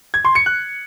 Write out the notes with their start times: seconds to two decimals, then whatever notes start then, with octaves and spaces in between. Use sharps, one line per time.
0.14 G#6
0.25 C6
0.35 C#7
0.46 F#6